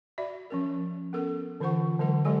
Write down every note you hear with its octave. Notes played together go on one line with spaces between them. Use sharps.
F#4 D5 E5 B5
F3 C#4 A#4
B3 C#4 A4 A#4
D3 E3 F4 C5 F#5 C#6
D3 F#3 G#3 A#4 F#5
F#3 G#3 G4 A4 D5 G#5